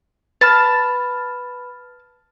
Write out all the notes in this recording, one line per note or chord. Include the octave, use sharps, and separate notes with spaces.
B4 A5 B5 F6